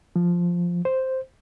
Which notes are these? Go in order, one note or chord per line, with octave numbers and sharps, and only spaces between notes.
F3
C5